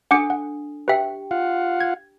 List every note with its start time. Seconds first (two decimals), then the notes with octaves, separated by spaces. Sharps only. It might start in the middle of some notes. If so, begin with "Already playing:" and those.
0.11 D4 A4 F#5 D6 C#7
0.30 F#5
0.88 G4 B4 E5 G5
1.31 F4 F5 F#5
1.81 G#6